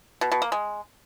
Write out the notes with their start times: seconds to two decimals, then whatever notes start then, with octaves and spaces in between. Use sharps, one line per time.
0.21 B2
0.32 B2
0.42 A#3
0.52 G#3